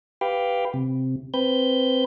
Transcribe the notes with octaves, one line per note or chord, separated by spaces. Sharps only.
G4 B4 F5 G5
C3
C4 B4 G6